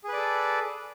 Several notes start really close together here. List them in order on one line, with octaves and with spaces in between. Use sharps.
G#4 B4 D5 A4